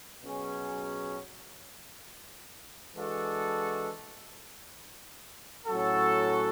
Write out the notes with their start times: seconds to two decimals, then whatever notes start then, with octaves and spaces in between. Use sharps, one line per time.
0.22 B2 F#3 C#4 G#4
2.95 E3 G#3 D4 F#4 A4
5.67 A2 F#3 C#4 F#4 A4